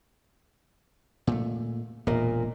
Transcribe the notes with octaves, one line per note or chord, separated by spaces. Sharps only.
A#2 A3
E1 A#2 A#3 A#4 D#5